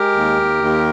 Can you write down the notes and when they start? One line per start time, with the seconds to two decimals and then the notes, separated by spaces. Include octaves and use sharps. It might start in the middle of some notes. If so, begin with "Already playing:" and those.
Already playing: G#3 G4 A#4
0.15 D#2
0.38 D#2
0.61 D#2